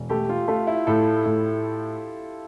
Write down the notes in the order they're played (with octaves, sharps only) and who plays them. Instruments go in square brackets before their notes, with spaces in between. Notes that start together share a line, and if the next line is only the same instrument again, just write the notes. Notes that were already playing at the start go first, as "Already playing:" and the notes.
Already playing: [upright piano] E1
[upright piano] A3 [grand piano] G4
[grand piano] F4
[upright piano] A3 [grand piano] F4
[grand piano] E4
[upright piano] A2 [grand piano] A4
[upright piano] A2